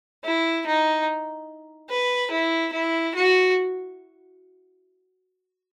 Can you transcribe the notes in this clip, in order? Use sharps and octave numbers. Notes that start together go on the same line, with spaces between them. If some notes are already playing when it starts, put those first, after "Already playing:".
E4
D#4
B4
E4
E4
F#4